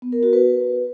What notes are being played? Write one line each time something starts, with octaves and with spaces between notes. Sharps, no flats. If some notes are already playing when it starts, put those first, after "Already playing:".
B3
A#4
F#4
B4